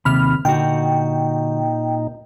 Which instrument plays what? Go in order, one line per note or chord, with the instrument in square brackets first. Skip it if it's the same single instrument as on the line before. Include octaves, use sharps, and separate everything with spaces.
[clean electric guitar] D#2 C3 [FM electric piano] B5 F6
[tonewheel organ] A#2 D#4 [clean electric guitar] D3 F#4 [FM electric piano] G5